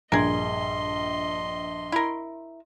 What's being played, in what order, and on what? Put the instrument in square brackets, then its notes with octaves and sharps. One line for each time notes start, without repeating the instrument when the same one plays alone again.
[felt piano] A#1 G2 [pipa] G#4 A#4 [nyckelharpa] D#5 C6
[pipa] E4 A#4